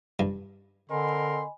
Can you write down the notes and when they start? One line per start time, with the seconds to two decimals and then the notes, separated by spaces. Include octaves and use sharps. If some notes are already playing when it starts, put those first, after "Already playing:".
0.19 G2
0.90 D3 C4 A#4 D#5 G#5 B5 C6